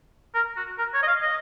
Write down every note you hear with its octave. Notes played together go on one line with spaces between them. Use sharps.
A#4
F#4
A#4
C#5
D#5
F5
D#5